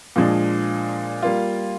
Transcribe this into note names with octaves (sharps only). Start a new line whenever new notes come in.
A#2 F3 G#3 D4
G3 A#3 F4